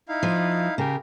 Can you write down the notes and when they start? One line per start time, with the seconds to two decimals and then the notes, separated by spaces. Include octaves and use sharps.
0.09 D#4 E4 F5
0.23 F3
0.78 C#3 G4 A#4